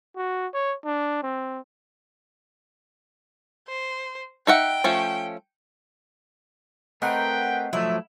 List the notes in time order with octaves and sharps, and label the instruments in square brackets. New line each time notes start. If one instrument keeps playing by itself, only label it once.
[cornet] F#4
C#5
D4
C4
[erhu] C5
[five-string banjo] D#4 E5 F#5 [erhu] G5
[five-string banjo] F3 A3 C#4
[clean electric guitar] A3 C4 [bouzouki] A#4 [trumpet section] B4 G5 [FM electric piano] D#5 F#5
[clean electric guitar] F3 F#3 A3 [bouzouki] E4